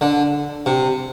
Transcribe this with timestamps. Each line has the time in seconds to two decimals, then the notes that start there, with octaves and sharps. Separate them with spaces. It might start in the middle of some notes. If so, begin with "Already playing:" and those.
0.01 D3
0.66 C3